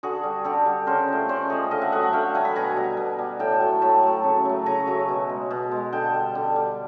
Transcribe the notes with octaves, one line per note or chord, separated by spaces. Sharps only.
D3 F#4 G#4
G3
D3 G4 A4
G3
C#3 A#4 C5
F3 A3
C#3 C5 D5
F3 A3 C#5 D#5
D3 D#5 F5
E5 F#5
F#3 A3 E5 F#5
E5 F#5
D3 F5 G5
F#3 A3 F#5 G#5
B5
B2 G#5 A#5
G3
B2
G3
A2 G5 A5
F#3 A3
A2 A5 B5
F#3 A3
C#3
F#3 A3
C#3 G#5 A#5
F#3 A3
B2
G#3
B2
G#3
D3 G5 A5
G3
D3
G3